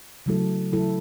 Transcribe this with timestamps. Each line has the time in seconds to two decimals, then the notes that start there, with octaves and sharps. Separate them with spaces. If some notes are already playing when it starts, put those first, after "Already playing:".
0.26 C#3 F#3 A3 E4 A4
0.72 C#3 F#3 A3 E4 A4